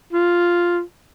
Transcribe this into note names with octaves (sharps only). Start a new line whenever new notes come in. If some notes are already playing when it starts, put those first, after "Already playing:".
F4